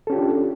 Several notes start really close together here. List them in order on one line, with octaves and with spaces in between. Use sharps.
A4 C#4 G4 F4 D4